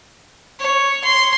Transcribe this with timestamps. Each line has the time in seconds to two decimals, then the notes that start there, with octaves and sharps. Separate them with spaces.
0.60 C#5
1.04 C6